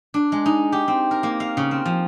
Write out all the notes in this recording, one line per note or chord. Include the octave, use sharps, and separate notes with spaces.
D4
G#3
D#4
G4
C4
A#4
A#3
F5
C#3
C4
F3